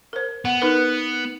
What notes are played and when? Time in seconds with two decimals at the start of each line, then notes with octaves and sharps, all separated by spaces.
0.13 A#4 C5
0.45 B3 F#5
0.62 D#4 A#4 B4